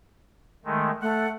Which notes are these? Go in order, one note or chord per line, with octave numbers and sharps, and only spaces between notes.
D#3 G#3 A3
A3 F#5